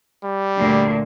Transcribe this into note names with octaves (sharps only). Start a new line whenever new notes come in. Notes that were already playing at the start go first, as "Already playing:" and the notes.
G3
D2 A#2